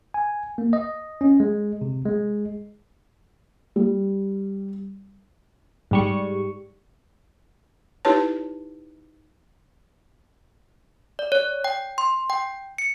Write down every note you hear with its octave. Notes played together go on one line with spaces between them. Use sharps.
G#5
A#3
D#5
C#4
G#3
C3
G#3
G3
G#2 G3 C#6
D#4 E4 G4 B4 C#5 A5
D5
C#5
G5
C6
G5
C#7